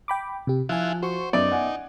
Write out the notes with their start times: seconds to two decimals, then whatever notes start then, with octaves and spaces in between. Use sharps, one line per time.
0.08 G5 B5 D6
0.47 C3 G4
0.69 F3 E4 F4 G#5 F#6
1.02 F#4 C5 C#6
1.33 F#2 B3 D#4 D5 E5 D7
1.52 F#5 G#5